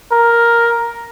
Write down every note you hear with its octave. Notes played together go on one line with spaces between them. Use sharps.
A#4